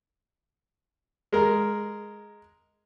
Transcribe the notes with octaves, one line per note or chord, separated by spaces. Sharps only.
G#3 A#4